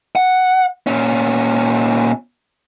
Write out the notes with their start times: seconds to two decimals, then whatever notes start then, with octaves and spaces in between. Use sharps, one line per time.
0.16 F#5
0.87 A#2 C#4